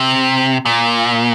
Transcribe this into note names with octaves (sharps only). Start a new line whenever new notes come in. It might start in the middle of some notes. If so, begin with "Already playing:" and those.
Already playing: C3
A#2